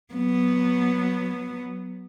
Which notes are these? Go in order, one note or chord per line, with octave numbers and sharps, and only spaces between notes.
F#3 B3